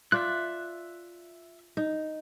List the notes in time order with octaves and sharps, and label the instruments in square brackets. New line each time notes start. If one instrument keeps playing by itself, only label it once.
[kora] F4 D5 [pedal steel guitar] E5 F#6
[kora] D#4